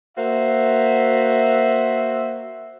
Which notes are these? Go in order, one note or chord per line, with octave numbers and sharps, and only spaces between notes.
A#3 F#4 C5 E5